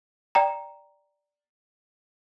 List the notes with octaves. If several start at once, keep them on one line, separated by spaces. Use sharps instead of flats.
D5 G5 A#5